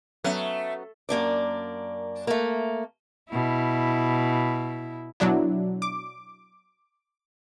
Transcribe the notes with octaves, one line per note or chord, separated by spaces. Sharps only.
F#3 A3 B3 C#4
F#2 A#3 D4 D5
A3 A#3
B2 E4
B2 F#3 D4 E4
D6